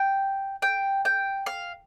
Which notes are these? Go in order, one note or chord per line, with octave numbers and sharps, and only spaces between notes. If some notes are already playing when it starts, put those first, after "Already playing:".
Already playing: G5
G5
G5
F5